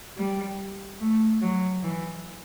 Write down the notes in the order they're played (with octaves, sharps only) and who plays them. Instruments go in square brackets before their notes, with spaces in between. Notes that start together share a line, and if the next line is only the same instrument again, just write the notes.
[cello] G3
A3
F#3
E3